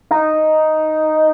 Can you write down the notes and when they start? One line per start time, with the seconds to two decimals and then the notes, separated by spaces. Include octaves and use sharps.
0.11 D#4